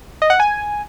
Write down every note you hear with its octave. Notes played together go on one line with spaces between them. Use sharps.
D#5
F#5
G#5